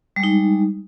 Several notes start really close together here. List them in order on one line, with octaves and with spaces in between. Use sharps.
G3 G#3 D#4